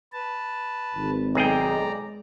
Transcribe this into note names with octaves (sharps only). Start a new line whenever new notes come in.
B4 A5
G#1
B1 G#3 G#4 D5 G5 A#5